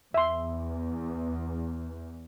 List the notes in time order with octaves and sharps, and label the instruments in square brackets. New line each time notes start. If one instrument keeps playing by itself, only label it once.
[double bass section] E2 [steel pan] E5 C6